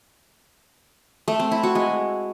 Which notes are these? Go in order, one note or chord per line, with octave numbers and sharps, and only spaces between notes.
A3
C4
E4
F#4
G#3